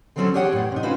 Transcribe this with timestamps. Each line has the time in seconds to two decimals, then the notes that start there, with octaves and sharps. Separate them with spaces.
0.16 D3 E3 F#3 C4 C#4 A4
0.34 G4 G#4 C#5 F#5 G5
0.53 E2 A2
0.72 C3 D#4
0.83 C#4 F4 F#4 B4 C5